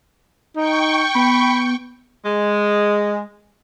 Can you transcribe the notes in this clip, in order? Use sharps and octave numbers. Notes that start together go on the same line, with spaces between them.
D#4 G5 C#6
B3 B5
G#3